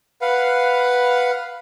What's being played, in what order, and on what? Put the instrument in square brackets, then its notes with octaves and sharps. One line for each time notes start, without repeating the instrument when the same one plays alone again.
[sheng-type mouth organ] B4 F5 F#5